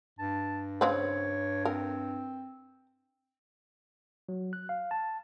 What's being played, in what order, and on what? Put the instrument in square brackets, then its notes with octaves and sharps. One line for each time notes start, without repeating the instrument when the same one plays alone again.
[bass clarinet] G2 [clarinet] A5
[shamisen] C#3 C4 B4 [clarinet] C#5
[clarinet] C4 [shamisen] A#4
[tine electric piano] F#3
F#6
F5
A5